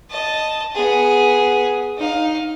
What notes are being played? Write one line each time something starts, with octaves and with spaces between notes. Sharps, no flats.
D#5 A5
B3 G#4
D#4 F5